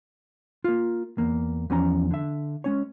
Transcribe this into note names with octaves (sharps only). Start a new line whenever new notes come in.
A#3 F4
E2 A#3
E2 F3 C#4 A#5
D3 E5
G#3 C#4 C#5